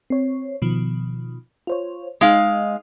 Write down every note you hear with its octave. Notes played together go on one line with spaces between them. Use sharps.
C4 C#5
B2 D#3 F3
F4 C5 C#5
G#3 D#4 D#5 F5